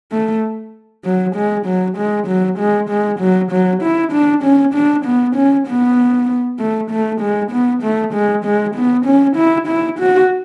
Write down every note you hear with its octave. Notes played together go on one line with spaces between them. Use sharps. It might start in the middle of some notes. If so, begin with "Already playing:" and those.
A3
F#3
G#3
F#3
G#3
F#3
G#3
G#3
F#3
F#3
E4
D4
C#4
D4
B3
C#4
B3
A3
A3
G#3
B3
A3
G#3
G#3
B3
C#4
E4
E4
F#4